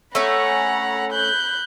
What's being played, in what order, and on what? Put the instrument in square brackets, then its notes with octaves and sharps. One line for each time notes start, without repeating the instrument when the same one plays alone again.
[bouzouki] A3 C#4 [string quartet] F#5 A#5 B5
[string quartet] B5 F#6 G6